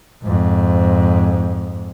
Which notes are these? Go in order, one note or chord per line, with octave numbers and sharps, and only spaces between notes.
F2 G#2